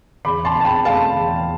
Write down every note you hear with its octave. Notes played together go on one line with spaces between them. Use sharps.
E2 B5 D6
A5 C6
B2
A5
G5 B5
A3 F5 A5
E2